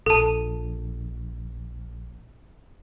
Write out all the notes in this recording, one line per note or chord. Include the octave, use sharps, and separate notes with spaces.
A#1 A4 A5